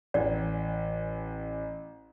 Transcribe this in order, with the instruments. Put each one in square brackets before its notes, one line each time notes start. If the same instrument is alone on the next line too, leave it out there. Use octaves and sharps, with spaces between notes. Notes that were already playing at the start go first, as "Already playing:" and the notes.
[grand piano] A1 [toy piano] D5